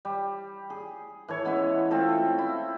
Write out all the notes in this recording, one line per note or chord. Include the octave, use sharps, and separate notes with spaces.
G3
G#4
E3 A4 C#5
G#3 B3 C#4 E4
A3 C4 F4 A4
E4